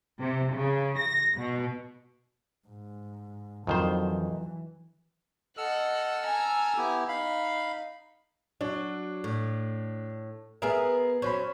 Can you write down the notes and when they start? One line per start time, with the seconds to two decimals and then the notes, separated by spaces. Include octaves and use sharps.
0.21 C3
0.53 C#3
0.98 A#6
1.36 B2
2.68 G#2
3.67 F2 D3 D#3 F#3 C5
4.01 E3
5.57 A4 D#5 F#5 E6 F6
6.25 G#5 A#5
6.77 B3 E4 G4
7.08 D#4 F5 B5
8.61 F#3 D4
9.24 A2
10.62 B3 G#4 A#4 E5
11.22 F#3 C#4 C5 B5